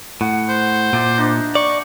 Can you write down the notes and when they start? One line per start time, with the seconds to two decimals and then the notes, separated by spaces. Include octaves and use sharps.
0.21 A2 F#5
0.49 C5
0.93 A#2 D5 E5
1.18 D4 D#4
1.55 D5 C#6